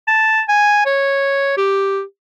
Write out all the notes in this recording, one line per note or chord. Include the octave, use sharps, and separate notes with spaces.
A5
G#5
C#5
G4